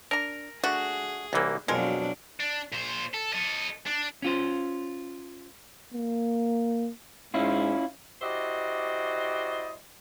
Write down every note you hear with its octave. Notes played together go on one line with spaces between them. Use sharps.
D4 A#4 A#5
A3 D4 F#4 G#4
C2 D#3 E3 F#3 A#3
F2 B2 F#3 G#3 D4 F4 A#4
D4
A#2 C5
A4
A4 D#5
D4
C#4 F4 C5
A#3
G#2 C#4 E4 F4
E4 F#4 G4 C5 D5 D#5